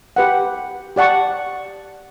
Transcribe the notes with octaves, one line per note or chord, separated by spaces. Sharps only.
G4 B4 F#5
G4 D5 F#5 A5 C#6